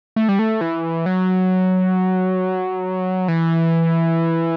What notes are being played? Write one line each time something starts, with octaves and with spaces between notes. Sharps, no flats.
A3
G3
A3
E3
F#3
E3